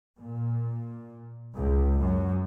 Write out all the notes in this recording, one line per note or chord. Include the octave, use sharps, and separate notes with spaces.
A#2
C#2
F#2